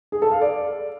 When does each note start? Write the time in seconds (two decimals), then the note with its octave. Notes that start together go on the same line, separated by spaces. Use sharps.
0.12 G#4
0.22 A4
0.32 F5
0.41 D5